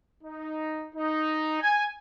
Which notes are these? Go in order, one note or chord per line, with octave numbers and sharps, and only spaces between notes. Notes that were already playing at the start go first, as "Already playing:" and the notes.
D#4
D#4
G#5